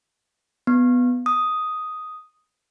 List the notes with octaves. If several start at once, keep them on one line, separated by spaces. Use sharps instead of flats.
B3
D#6